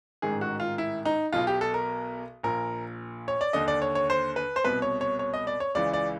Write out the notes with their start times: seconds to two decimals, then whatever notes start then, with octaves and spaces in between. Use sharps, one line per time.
0.22 A1 G#2 D#3 G#4
0.41 F#4
0.60 F4
0.78 E4
1.05 D#4
1.32 B1 B2 F4
1.47 G4
1.61 A4
1.74 A#4
2.43 A#1 A#2 A#4
3.28 C#5
3.41 D5
3.53 D#2 D3 D#5
3.68 D5
3.82 C#5
3.95 C#5
4.10 C5
4.36 B4
4.56 C5
4.64 C2 B2 B4
4.82 C#5
5.01 C#5
5.19 C#5
5.34 D#5
5.47 D5
5.60 C#5
5.75 C#2 C#3 E3 D5
5.93 D5